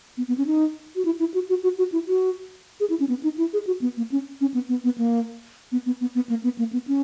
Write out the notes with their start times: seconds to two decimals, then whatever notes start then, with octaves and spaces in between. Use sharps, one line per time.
0.17 B3
0.28 B3
0.38 C#4
0.47 D#4
0.96 F#4
1.05 E4
1.20 E4
1.34 F#4
1.49 F#4
1.63 F#4
1.78 F#4
1.92 E4
2.08 F#4
2.80 G#4
2.90 E4
3.00 C#4
3.09 B3
3.23 D#4
3.38 E4
3.53 G#4
3.67 F#4
3.81 B3
3.97 A#3
4.12 C#4
4.41 C#4
4.54 B3
4.69 B3
4.84 B3
4.98 A#3
5.72 B3
5.86 B3
6.01 B3
6.15 B3
6.29 A#3
6.43 B3
6.59 A#3
6.73 B3
6.88 C#4